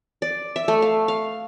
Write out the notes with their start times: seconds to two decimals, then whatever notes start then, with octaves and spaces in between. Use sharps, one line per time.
0.22 D5
0.56 E5
0.68 A3
0.82 F5
1.08 F5